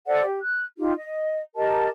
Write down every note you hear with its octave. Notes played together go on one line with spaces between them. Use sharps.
A4 C5 D5 F#5
G4
F#6
D#4 F4 G4
D#5
G4 A#4 D#5 A5